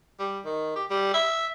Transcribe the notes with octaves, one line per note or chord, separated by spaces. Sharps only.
G3
D#3
G4
G3
E5